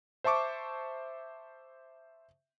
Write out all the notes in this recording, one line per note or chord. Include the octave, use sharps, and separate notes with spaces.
C5 E5 A5 C#6 D6